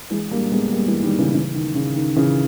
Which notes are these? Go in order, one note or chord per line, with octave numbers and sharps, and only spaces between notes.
E3 G#3
G3 A#3
G#3 B3
G3 A#3
E3 G#3
D#3 G3
C#3 E3
C#3 E3
D#3
C#3
D#3
C#3 E3